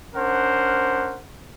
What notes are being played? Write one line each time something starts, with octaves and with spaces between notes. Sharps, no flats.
C#4 D4 A#4 C5 F#5